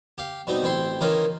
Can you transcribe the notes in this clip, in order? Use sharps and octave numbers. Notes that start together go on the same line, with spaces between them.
G4 F5
B2 G3 C4 D#4
A1 C4 E4 G5 C6
D#3 E3 A#3 C#4 D#4 F4